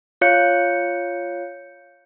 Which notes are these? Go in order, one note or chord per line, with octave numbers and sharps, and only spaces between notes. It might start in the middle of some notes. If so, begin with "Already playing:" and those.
F4 C#5 F5 F#6 G6 C#7